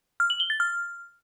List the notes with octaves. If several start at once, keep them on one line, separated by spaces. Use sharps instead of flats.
F6
F#7
G7
A6
F6